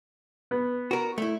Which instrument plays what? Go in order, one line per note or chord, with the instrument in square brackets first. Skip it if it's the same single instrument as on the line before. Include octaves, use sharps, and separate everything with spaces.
[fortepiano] B3
[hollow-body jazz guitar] F#4 A#4
A3 E4